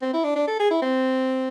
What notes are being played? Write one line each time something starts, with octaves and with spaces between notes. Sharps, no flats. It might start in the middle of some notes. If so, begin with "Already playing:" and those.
C4
E4
D4
D4
A4
G#4
E4
C4